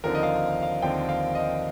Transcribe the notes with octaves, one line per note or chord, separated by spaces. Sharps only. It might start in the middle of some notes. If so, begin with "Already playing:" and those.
D#2 D3 F3 C4 A#4
D#5
F5
F5
D#2 D3 F3 C4 G5
F5
D#5